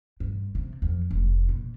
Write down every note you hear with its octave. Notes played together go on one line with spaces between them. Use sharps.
G2
C3
F2
F1
A#2